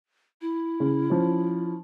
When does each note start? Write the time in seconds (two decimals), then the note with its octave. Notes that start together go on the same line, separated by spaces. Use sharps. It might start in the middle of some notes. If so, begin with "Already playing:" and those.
0.41 E4
0.80 C#3
1.10 F3 C#4